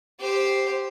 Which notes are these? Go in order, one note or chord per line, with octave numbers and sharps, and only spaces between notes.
G4 C5